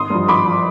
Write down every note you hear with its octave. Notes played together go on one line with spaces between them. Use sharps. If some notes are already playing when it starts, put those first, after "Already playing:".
Already playing: G#1 C6 D#6
G2 F3
G#1 B5 D6
F3